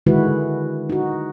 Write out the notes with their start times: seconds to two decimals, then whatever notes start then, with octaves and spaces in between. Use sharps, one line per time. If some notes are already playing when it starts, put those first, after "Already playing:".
0.06 D3 D#3 G#3 E4 F#4 B4
0.90 D#4 F#4